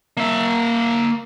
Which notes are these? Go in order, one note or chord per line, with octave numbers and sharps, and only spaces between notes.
A#3 E5